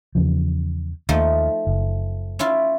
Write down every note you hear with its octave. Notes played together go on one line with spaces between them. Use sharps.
E2 C#3 F3
D#2 F3 A3 D#4
F#1
C#4 E4 F4